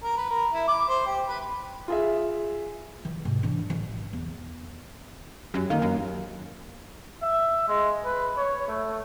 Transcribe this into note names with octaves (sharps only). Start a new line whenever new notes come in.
A#4
B4
A#4
E4
D6
C5
G4
B4
F4 G#4 E5
E3
G#2 C3
E3 D4
A1 E3
E2
F#2 G4
D#3 A#3 A#4 F5
F#2
E5
G#3
B4
C#5
A3